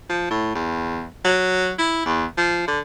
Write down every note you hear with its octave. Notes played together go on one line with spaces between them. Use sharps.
F3
A2
E2
F#3
E4
E2
F3
D3